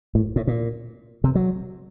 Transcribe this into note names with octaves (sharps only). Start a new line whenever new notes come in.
A2
A2
A#2
C3
F#3